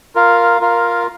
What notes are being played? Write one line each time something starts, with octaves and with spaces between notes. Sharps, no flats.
F4 A#4 F5
F4 A#4 F5